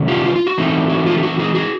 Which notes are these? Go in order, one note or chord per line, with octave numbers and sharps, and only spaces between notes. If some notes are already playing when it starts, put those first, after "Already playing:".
Already playing: C3 D#3 F#3 A3 C#4
F4 G4
F4
F4
F#4
E3 A3 C4 D#4
F#4
F4
G4
F#4
F#4 G#4
F#4 G#4